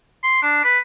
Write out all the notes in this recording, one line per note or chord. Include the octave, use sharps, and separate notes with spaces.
C6
D4
B4